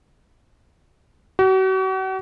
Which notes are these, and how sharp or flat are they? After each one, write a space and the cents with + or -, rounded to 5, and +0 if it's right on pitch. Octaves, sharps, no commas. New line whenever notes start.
F#4 +40